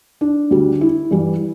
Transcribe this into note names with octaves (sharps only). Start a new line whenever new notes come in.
D4
D2 D3 G3
E4
G2 E3 G3